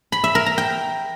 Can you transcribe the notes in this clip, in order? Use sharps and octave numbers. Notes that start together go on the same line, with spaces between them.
B5
E5
A#4
A#5
G5